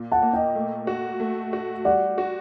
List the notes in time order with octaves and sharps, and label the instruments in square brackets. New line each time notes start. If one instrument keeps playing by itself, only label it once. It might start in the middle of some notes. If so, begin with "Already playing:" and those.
Already playing: [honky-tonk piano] A#2
[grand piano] F#5 A5
[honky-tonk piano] A#3
[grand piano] D#5 G5
[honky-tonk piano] A3
F#4
A3
F#4
[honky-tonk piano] G3 [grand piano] D5 F#5
[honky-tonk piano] F#4